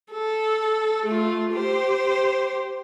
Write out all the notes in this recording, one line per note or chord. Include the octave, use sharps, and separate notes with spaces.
A4
A3 F4
G4 C5